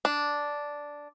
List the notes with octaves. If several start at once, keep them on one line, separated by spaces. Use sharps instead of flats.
D4